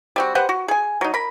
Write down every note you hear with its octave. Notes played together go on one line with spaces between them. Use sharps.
G3 C4 F#4
G4 B4 C5 F#5
F#4
G#4 G#5
F#3 D#4
A#4 B5